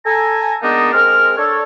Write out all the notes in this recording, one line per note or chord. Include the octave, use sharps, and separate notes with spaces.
A4 G#5 A#5
G#3 A#3 B3 D4 D#4
G#3 C4 A#4 F6
D4 A4 C#5